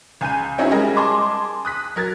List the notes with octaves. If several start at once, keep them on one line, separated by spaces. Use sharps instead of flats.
C#2 G#5 G6 D#7
C4 C#4 D#4 E4 F#4 G#4
G3 G#3 G#4 A#4 D#5
G#4 A5 C6 D6
D#6 F#6 B6
F#3 A#4 G#6 A6